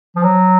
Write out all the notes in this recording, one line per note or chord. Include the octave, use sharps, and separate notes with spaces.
F3
F#3